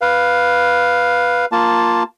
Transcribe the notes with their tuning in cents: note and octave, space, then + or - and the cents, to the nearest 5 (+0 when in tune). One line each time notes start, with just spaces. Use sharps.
B4 +0 F5 +5
A#3 +0 F4 +0 A5 +0